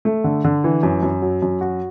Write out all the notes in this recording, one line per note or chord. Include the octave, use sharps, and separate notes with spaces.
A3
D3
D3
E3
F#2
F#2
F#3
F#2
F#4